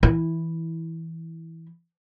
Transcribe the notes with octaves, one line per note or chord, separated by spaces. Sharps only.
E3 E4